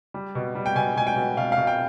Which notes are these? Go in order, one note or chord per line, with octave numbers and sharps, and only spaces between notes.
G3
B2
G3
G5
B2 G#5
B2 G#5
G5
B2
B2 F5
F5
B2
G5